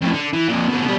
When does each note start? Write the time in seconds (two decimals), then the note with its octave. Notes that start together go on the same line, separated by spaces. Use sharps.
0.02 F2 A2
0.13 D3
0.33 E3
0.48 F2 A#2
0.69 B2 D3
0.85 B2 G3